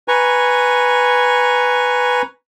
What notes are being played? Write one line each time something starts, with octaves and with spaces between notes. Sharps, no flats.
B4 G#5 A#5 C#6